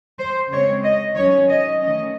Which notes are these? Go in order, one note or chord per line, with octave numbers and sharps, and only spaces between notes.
C5
C#3 G#3 C4 C#5
D#5
D#3 F#3 C#4 C#5
D#5
D#3 A3 C#4 D#5